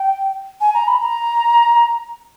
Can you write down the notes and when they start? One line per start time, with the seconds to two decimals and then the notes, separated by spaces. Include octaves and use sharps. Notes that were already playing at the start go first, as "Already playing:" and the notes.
Already playing: G5
0.60 G#5
0.74 A#5
0.87 B5
1.01 A#5